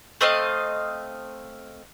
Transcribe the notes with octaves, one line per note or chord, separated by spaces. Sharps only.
A3 C4 D#5 F5